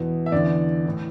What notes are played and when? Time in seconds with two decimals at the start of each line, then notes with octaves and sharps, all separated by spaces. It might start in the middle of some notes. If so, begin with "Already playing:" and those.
Already playing: E2 B2
0.26 E5
0.32 E2 D3 D5
0.85 A2 E3